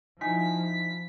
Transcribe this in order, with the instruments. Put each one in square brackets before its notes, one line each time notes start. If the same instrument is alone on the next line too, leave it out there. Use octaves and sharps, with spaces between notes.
[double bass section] F3 [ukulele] D#4 E4 G#5 [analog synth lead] B6